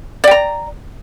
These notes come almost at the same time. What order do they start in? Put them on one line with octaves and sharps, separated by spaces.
D5 G5 A#5